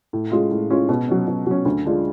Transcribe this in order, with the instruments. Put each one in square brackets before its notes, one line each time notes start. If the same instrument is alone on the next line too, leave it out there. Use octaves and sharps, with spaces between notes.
[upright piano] A2
G#3 C#4 F4
A2
G#3 C#4 F4
B2
F#3 C#4
B2
F#3 C#4
D2
D3 G#3 D4 F4